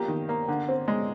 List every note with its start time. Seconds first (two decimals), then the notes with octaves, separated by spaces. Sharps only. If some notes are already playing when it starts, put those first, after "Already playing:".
Already playing: F3 A#3 G4
0.08 D#3
0.29 A#3
0.48 D3
0.69 C4
0.88 G#3